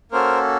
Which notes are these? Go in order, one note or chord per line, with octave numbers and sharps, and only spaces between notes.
A#3 C#4 F#4 A4 A#4 C5